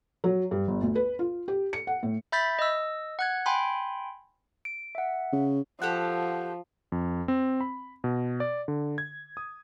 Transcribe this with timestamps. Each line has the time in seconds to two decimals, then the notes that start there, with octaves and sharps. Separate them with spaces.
0.24 F#3
0.51 G2
0.68 G1
0.82 D2
0.95 B4
1.19 F4
1.48 G4
1.73 C#7
1.87 F#5
2.03 A2
2.32 E5 B5 G6 A6 B6
2.59 D#5 E6
3.19 F#5 F#6 G#6
3.46 G5 G#5 B5 C6
4.65 D7
4.95 E5 F#5
5.32 C#3
5.82 F3 G4 A4 F#5
6.92 F2
7.28 C4
7.61 B5
8.04 B2
8.40 D5
8.68 D3
8.98 G#6
9.37 D#6